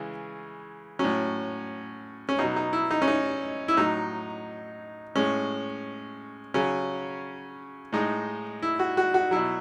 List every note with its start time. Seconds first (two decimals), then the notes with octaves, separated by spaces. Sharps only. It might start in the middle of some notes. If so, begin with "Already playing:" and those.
Already playing: C#3 E3 G#3
0.99 A2 F#3 C#4
2.29 C#4
2.39 B2 F#3 D#4
2.56 D#4
2.73 E4
2.91 D#4
3.02 C#4
3.08 D#4
3.68 E4
3.77 A2 F#3 D#4
5.16 A2 G#3 C#4
6.54 C#3 F#3 C#4
7.92 A2 G#3 D#4
8.62 E4
8.79 F#4
8.97 F#4
9.14 F#4
9.31 B2 F#3 E4